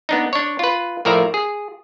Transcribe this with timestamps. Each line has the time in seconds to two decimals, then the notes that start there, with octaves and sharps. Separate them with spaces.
0.09 B3 D4 D#4
0.33 D4 C#5
0.59 F4 B4
1.05 A2 F3 A#4 D5 E5 A#5
1.34 G#4